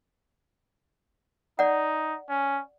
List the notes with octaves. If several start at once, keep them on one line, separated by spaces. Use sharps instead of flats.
D#4 D5 F#5
C#4